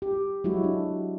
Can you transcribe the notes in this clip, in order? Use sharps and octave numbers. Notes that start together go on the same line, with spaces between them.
G4
F#3 G#3 E4 F#4
D4